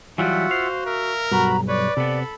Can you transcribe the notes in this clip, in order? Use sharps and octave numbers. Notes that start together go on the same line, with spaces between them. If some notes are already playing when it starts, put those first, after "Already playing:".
E3 F#3 G3 F4 F#4 E5 F#5
C5 F5
A#4 E5
B1 G2 F#4 A#5 B5
B4 C#5 D5
C3 B3 A4 B5